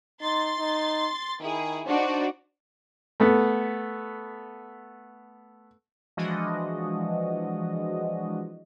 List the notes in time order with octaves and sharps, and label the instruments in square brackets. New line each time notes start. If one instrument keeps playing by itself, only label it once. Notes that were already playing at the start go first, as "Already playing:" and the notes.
[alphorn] D#4 [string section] C6 A6
[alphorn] D#4
[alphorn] D#3 [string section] E4 G#4
[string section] D4 D#4 F#4 [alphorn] C5
[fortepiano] A3 B3
[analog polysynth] E3 F3 G#3 D4 F#4 D#5